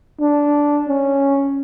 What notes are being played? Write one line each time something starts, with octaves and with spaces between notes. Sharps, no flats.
D4
C#4